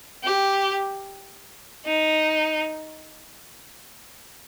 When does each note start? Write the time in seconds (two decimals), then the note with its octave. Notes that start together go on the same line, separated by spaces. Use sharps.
0.24 G4
1.86 D#4